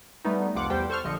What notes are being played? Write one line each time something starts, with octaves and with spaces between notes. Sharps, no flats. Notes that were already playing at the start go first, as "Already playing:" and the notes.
G3 A3 B3 D#4
C2 F2 F3 F4 F#5 D6
E2 G3 G4 C5 G5
A4 C5 C#6 F6
A#1 D3 F3 D#5 C#6